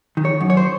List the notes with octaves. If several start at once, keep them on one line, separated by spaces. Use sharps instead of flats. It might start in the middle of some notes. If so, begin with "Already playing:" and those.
D#3
C#5
F#2
C#5
C5